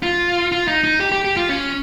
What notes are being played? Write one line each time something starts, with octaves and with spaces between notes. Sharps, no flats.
F4
F4
D#4
D#4
G4
G4
G4
F4
C#4